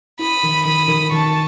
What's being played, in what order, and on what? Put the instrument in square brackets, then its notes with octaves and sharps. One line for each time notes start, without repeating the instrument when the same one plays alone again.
[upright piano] E4 [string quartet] B5 D#6
[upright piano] D#3
[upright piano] D#3 [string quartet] B5 D#6
[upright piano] D#3
[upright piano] D#3 [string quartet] A5 C#6